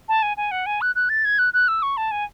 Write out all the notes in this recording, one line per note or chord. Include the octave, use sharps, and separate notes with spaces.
A5
G#5
G#5
F#5
G#5
F#6
F#6
A6
G#6
F#6
F#6
E6
C#6
A5
G#5